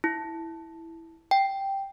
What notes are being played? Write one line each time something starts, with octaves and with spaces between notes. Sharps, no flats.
E4
G5